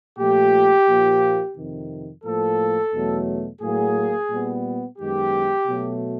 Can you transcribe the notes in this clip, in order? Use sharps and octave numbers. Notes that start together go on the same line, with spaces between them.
A#2 F3 A3 G4
A#2 F3 A#3
F2 C3 D#3
A2 F3 A#3 A4
E2 B2 F#3 A3
A2 F#3 A#3 G#4
A#2 G3 B3
F#2 D#3 G#3 B3 G4
B2 F#3 A3